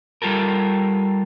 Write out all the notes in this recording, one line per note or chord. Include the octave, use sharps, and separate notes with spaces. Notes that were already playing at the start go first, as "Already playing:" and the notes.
G3 F4 G4 A4 A#4